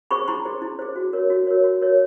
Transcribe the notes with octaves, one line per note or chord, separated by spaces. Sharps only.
G#4 C5 B5 C#6
E4 A#5 C6
G#4 C5
E4
G#4 C5
F#4
A#4 C#5
F#4
A#4 C#5
F#4
A#4 C#5